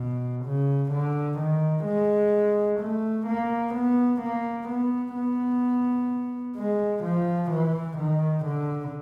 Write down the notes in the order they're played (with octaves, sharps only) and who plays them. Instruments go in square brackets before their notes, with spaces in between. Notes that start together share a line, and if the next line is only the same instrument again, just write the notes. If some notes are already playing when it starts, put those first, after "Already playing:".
Already playing: [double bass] B2
C#3
D3
D#3
G#3
A3
A#3
B3
A#3
B3
B3
G#3
F3
E3
D#3
D3